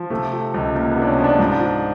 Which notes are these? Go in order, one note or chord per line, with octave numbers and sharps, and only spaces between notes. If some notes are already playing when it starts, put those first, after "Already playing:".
Already playing: F3
C3 A3
F3
C#2
C#2 A#3
C3 B3
D4
C#4
F3
D4
G#2
F3